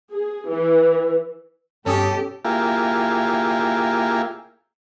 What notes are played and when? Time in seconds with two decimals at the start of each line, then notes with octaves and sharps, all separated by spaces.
0.12 G#4
0.49 E3
1.86 G2 B2 C#4 G4 A4 G#5 D#6
2.45 A#3 E4 F4 G4 G#4